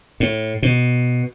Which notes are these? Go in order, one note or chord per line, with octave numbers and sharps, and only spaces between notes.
A2
B2